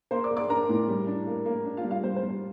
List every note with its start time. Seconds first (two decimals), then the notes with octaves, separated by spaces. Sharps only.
0.11 A#3 C5 C6
0.24 D5 D6
0.31 A#3
0.37 D5 D6
0.49 D4 A#4 A#5
0.69 A2
0.88 G3
1.07 D4
1.27 A#3
1.46 A#3
1.65 D4
1.77 F4 F5
1.84 G3
1.91 F4 F5
2.03 G3 C5
2.16 C5
2.23 G3
2.29 C5